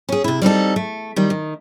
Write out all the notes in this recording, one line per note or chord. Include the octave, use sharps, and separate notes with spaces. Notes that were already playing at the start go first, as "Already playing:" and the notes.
C#4 G#4
C3 E4
G3 C4 D#4 A4
A3
D#3 G3
D#3